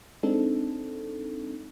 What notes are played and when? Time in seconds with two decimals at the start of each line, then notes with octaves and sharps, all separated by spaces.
0.23 G#3 C4 D4 D#4 A4